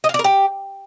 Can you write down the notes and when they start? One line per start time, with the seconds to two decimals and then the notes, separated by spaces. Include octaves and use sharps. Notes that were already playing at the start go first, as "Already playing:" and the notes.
0.04 D#5
0.09 F5
0.14 D5
0.19 A#4
0.24 G4